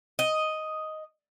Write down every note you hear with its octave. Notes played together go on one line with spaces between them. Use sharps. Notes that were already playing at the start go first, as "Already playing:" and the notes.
D#5